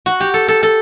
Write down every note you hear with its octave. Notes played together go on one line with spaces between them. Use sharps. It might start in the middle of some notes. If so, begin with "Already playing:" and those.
F#4
G4
A4
A4
A4